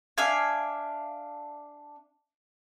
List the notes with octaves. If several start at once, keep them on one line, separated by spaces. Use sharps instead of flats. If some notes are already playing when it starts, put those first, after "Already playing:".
D4 E5 F5 G#5